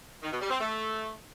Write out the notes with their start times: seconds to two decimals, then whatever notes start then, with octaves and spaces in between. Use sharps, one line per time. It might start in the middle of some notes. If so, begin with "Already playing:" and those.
0.22 D#3
0.32 B2
0.41 G3
0.50 C4
0.60 A3